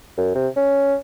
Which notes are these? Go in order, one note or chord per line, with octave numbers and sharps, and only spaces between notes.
F#2
C3
C#4